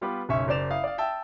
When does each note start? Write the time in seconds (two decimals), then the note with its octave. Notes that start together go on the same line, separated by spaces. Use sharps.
0.01 G3 B3 F4 G4 B4
0.29 F#1 B1 C#4 E5 C#6
0.48 F#1 C5 D5 E7 F7
0.71 E4 F5 D#6
0.84 D5 F5
0.98 E5 G5 A5 E6